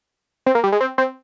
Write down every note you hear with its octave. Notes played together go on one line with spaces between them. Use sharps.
C4
A#3
G3
G#3
C4
C4